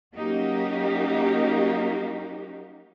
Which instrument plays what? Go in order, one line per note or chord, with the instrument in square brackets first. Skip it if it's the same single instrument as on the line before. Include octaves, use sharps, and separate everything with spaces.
[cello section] F#3 A#3 C#4 D#4 F#4 G4